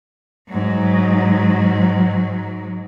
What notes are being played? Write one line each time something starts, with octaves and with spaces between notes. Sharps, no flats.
G#2 F#3